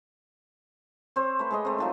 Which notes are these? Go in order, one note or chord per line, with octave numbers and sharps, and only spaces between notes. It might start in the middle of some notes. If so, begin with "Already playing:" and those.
C4 C5 C#5
A3 B4
G#3 G4 D#5
A3 C4
D#3 F3 F#3